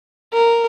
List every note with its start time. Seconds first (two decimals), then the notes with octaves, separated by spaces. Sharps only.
0.34 A#4